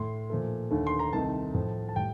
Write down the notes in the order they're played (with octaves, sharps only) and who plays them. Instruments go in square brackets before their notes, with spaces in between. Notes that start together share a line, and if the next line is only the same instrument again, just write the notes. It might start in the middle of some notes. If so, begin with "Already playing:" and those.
Already playing: [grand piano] A2 A3 C6
A#2 F3 A3
D#2 D3 A3
C6
A#5
C2 C3 D#3 A3 A5
A2 F3 A3
A5
A2 G3 G5